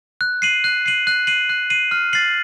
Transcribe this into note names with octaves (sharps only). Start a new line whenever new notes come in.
F#6
C7 D#7 F#7
F#6
C7 D#7 F#7
F#6
C7 D#7 F#7
F#6
C7 D#7 F#7
F6
A6 C7 F#7